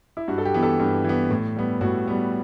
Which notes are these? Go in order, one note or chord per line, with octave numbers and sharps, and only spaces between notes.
E4
G2 F#4
A4
G4
E3 B3
A4
G2
E3 B3
A2
G3 B3
A2 F#4
G3 B3